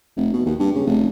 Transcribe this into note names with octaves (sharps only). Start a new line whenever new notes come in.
F1
B2
D#2
G2
C#3
F1